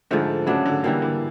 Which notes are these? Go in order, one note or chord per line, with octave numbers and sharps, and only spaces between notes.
G#2 D3 F3 A3
C#3 F#3 A3 D4
D3
D3 E3 G3 A#3
D3